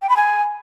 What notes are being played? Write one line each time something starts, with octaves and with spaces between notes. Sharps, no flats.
G5
B5
G#5